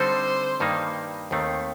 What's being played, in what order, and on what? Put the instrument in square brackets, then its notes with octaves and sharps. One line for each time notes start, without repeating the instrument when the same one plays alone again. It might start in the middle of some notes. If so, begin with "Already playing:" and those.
Already playing: [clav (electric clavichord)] D3 G3 C4 D#4 A4 [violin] C5
[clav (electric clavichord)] G2 D#3 G3 A#3 D#4
D#2 D#3 A3 C4